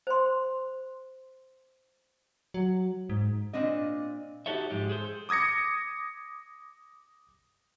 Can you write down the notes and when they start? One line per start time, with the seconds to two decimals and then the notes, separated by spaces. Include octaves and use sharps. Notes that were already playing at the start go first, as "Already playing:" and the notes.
0.07 C5 C6
2.54 F#3
3.09 G#2
3.53 A#2 C4 D4 D#5
4.46 D#4 F#4 G4 A4 C#5 E5
4.70 G#2 F3 G#3 G4
4.89 G#4 A4 C5
5.29 D6 D#6 G#6 A#6 C#7